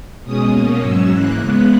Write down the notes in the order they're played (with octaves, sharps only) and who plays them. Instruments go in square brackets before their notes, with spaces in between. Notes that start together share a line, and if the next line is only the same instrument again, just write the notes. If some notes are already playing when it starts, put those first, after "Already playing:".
[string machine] B2 G#3 C#4 D#6
B2 A#3 C#4 D#6
G#2 F#3 C#4 E6
G#2 E3 A#3 F#6
C#3 G#3 B3